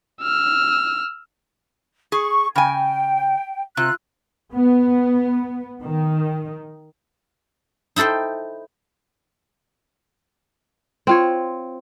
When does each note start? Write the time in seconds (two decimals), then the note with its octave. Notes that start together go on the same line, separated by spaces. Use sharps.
0.23 E6 F6
2.12 G#4 C#6
2.56 C#3 G5 G#5
3.77 C3 F4 F#6
4.53 B3
5.82 D#3
7.96 D#4 E4 A4 C5 G5
11.07 C4 F4 C#5